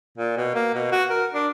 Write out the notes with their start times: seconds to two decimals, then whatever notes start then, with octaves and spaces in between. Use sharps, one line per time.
0.17 A#2
0.37 B2
0.55 A#3
0.74 B2
0.92 F#4
1.10 A#4
1.34 D4